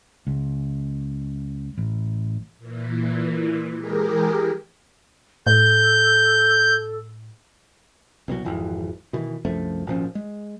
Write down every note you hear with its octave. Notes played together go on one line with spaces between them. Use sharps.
C#2
A1
A#2 E3
E3 G#3 G4 G#4 A#4
A2 A4 G6
C2 B2 D3 F#3
G#1 F2 E3
B2 D#3 E3
C2 F#2 F3 A3
G#1 A#2 F3 C#4
G#3